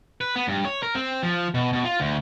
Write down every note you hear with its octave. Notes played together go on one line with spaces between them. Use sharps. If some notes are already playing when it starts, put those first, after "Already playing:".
B4
B3
G2
C#5
A#4
C4
F3
B2
B2
F4
D2